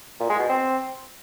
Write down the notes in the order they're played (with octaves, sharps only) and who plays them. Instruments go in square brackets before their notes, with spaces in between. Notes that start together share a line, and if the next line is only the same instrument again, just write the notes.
[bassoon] A#2
G#3
B2
C4